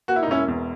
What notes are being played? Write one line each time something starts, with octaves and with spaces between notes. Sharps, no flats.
A#3 F#4
E4
D#4
E1 C#4 E4
E2